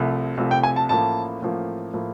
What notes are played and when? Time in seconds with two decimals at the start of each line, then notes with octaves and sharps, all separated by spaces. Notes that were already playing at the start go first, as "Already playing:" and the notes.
Already playing: C2 C3 F3 A3
0.37 C2 C3 F3 A3
0.51 G5
0.63 G#5
0.76 A5
0.89 A1 A2 F3 A#3 A5
1.42 A1 A2 F3 A#3
1.93 A2 F3 A#3